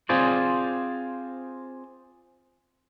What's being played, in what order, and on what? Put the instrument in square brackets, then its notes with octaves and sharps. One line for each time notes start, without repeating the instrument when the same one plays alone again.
[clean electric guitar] C4 F4 G#4 C5 D5